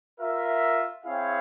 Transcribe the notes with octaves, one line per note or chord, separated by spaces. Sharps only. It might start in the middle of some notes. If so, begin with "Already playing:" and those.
F4 A#4 E5
C4 E4 G#4 C#5 F5